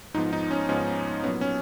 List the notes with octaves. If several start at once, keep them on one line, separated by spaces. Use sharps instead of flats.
G#2 F3 B3 D#4
D#4
C#4
G#2 F3 B3 C#4
A#2 F#3 B3 C#4
C#4